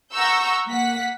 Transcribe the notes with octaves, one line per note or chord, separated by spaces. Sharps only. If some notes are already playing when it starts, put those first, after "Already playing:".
F#5 A#5 C#6 E6 G6
A#3 F#5 B6